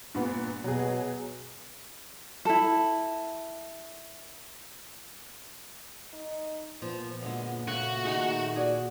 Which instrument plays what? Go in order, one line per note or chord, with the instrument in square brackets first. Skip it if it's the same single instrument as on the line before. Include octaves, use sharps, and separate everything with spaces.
[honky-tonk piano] G2 A#2 B3
[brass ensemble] B2 [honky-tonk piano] F#3 G#4
[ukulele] E4 A4
[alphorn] D#4
[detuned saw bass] A#2 [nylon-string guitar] F3 [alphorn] B3
[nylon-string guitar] F#2 D3 G#3
[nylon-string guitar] C#3 [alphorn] A3 [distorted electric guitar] F#4
[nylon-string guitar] D#3 D#4 G#4
[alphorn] F#4 [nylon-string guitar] G#4 D5